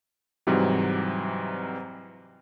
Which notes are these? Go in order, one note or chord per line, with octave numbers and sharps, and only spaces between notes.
G#2 C3 E3 F#3 G3